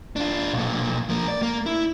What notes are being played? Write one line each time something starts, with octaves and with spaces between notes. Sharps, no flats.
D4 F4
B1 A#2
F3 A#3
D5
A#3
E4